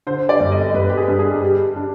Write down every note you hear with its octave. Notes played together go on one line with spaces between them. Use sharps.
D3 C5
D5
G1
D#5
G1 B4
G4
G#4
G2
G#4
G3 G4
D4